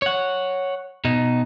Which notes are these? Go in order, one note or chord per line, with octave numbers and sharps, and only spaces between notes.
C#5 F#5
B2 D#4